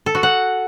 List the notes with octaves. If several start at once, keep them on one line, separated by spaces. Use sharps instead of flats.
A4
F#4
F#5